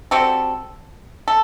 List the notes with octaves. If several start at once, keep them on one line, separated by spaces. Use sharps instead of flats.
G3 C4 F#4 A4
A4